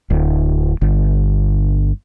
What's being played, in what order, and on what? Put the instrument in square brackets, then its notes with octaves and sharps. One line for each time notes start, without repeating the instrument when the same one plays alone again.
[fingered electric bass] D1
G1